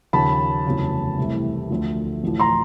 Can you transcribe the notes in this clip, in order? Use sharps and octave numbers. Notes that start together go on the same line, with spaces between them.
D#2 C#3 F3 A5 B5
F1 E2 C#3 F#3
C2 C3 E3 A3
D2 D3 F3 A3
A1 A2 F3
A#5 C6